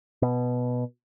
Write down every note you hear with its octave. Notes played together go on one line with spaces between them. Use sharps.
B2